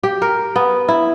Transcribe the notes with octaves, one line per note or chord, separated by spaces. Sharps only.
G4
A#4
B3
E4